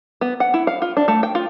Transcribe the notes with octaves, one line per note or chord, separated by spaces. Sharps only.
B3
F#5
E4
F5
F4
D4
A3
G5
F4